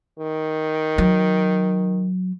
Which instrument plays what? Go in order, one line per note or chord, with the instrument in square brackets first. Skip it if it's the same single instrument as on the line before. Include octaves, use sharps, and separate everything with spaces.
[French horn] D#3
[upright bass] F#3